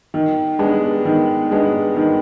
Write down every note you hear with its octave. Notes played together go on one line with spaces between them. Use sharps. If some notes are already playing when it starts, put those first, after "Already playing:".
D#3
G#3 B3 D4
D#3
G#3 B3 D4
D#3